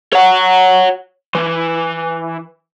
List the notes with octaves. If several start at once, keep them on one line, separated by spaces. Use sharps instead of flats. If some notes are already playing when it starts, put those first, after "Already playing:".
C#5 F#5
E3